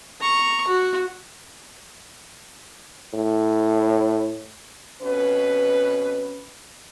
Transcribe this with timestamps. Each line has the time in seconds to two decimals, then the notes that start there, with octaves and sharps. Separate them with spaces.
0.21 A#5 C#6
0.67 F#4
3.14 A2
5.02 F2 B2 C#4 B4